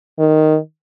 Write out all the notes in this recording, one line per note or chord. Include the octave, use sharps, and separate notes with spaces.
D#3